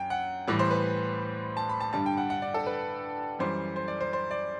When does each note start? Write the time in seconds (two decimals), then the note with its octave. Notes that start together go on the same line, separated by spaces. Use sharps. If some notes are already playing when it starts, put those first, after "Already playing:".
Already playing: F#2 G5
0.10 F#5
0.48 A2 E3 G3
0.59 C5
0.71 B4
1.57 A5
1.69 B5
1.80 A5
1.93 G2 D3 G3 A5
2.06 G5
2.17 F#5
2.30 F#5
2.42 D5
2.54 A4
2.67 B4
3.39 F#2 E3 G3 C5
3.76 C5
3.88 D5
4.01 C5
4.13 C5
4.31 D5